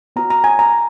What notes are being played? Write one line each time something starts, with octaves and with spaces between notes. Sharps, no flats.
B3 F#4 A#5
A#5
G#5
A#5